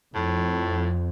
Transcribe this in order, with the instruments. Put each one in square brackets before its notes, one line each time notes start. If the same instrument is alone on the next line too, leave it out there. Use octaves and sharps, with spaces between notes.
[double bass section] F2 [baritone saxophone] A2